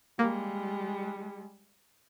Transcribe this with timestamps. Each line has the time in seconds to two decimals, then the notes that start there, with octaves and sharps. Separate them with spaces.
0.19 G3 G#3 A#3